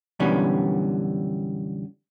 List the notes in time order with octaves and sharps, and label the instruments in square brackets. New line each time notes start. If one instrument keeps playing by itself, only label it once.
[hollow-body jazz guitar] F#2 B2 D3 E3 G3 C#4